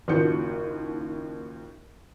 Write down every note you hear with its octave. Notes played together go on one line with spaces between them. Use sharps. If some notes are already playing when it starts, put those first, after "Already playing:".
F#1 D#2 F3 F#4 G6 C#7